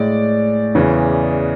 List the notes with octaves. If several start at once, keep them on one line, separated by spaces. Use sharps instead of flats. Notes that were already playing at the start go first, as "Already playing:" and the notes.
Already playing: A2 G#3 D5
E2 C#3 E3